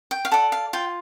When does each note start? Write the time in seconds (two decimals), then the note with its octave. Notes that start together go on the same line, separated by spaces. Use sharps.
0.11 G5
0.25 F5
0.32 A4 D5 F#5
0.52 F5
0.73 F4 G5